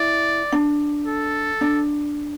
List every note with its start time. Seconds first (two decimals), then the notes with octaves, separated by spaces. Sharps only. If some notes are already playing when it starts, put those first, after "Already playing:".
Already playing: E4 D5
0.52 D4
1.06 A4
1.61 D4